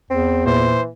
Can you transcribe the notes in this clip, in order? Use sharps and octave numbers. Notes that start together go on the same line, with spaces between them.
E2 C4
A#2 E3 C5